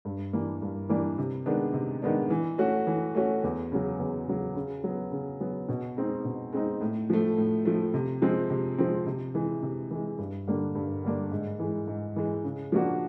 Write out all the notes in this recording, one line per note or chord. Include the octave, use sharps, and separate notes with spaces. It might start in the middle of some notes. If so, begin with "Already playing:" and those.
G2
E3 G3 A#3 D4
G2
E3 G3 A#3 D4
C3
D#3 G#3 B3 D4
C3
D#3 G#3 B3 D4
E3
A3 C#4 F#4
E3
A3 C#4 F#4
E2
C#3 F#3
E2
C#3 F#3
C#3
F#3 B3
C#3
F#3 B3
B2
G#3 C4 D#4
B2
G#3 C4 D#4
A2
F3 A3
A2
F3 A3
C3
F3 G#3 C4
C3
F3 G#3 C4
C3
E3 G#3
C3
E3 G#3
G2
D3 G3 A#3 D4
G2
D3 G3 A#3 D4
G#2
E3 G#3
G#2
E3 G#3
C#3
F3 A#3 D4 F#4